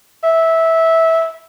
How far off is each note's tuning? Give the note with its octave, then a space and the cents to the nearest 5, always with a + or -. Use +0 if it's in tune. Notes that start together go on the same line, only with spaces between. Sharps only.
E5 -15